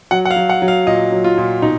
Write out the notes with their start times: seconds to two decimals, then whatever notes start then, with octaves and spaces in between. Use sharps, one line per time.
0.11 F#3 F#5
0.25 F#5
0.31 F5
0.36 F#3
0.49 F#5
0.62 F#3
0.68 F5
0.87 A#2 D#5
1.12 F#3
1.24 F4
1.38 A#2
1.62 B2 D#4